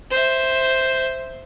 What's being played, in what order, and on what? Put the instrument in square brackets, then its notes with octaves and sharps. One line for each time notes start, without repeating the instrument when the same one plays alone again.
[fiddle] C5 E5